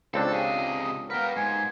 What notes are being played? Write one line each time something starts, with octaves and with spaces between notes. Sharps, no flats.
C#2 F3 A3 C4 D4 A4 F5
C3 C#4 G4 G#4 D#5
A#3 B3 A#4 B4 G5
G#2 G#5